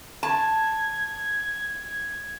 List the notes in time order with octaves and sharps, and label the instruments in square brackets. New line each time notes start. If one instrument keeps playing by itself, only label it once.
[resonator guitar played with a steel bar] A5 [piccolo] G#6